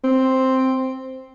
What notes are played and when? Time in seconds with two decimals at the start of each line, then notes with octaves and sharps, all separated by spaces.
0.04 C4